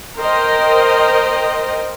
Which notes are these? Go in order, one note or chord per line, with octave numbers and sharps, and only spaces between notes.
A#4 C5 D#5 G5